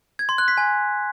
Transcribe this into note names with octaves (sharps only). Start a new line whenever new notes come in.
G#6
C6
F#6
B6
G#5